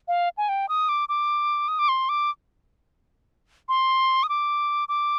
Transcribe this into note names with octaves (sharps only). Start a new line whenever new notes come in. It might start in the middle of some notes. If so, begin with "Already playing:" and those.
F5
G#5
G5
D#6
D6
D6
D#6
D6
C6
D6
C6
D#6
D6
D6